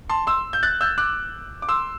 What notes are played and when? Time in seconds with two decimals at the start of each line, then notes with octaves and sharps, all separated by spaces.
0.09 A5 C6
0.27 C6 E6
0.53 G6
0.63 F#6 A6
0.81 E6 G6
0.98 D6 F#6
1.62 D6
1.69 C6 E6